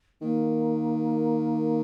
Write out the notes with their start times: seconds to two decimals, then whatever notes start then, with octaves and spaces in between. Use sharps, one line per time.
0.21 D#3 A#3